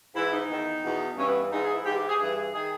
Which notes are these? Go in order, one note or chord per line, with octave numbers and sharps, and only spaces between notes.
G#2 E3 E4
D#4
E2 D#3
E2 B2
G2 E3 C#4
B3
G#2 E3 D#4
G#4
E4
G#2 E3 G4
G4
G#4
G2 E3 G#4
G#4
D#3 G#4